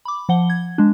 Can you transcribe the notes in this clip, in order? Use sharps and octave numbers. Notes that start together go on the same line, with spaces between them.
B5 D6
F3 F#5 G7
G#6
G#3 D4